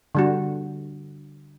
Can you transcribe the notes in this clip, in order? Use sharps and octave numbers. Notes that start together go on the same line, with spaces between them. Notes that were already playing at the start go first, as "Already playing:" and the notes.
D3 G3 F#4